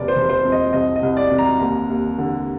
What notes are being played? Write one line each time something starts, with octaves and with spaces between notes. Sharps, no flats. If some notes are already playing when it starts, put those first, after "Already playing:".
Already playing: F1 D#2 D5
C5
F1
C5
F2
D#5
C2 D#5
D#5
C2
D5
C3
A#5
D#2
D#2
D3